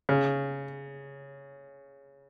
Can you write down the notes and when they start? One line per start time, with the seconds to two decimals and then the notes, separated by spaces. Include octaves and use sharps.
0.09 C#3